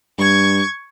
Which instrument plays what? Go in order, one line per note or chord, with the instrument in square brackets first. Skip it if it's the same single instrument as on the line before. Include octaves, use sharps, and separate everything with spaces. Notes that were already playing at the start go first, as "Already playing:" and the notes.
[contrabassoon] G2 [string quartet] C#6 G#6